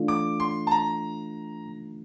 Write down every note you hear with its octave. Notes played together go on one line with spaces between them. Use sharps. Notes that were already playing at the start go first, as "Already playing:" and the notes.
Already playing: E3 A3 D4 F4
D6
C6
A5
A#5